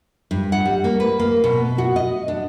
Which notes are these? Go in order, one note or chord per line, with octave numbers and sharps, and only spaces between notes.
G2
F#5
G3
A#3
B4
A#3
B2
F#4
D#5
D4